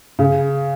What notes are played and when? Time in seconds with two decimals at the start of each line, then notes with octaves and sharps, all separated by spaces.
0.19 C#3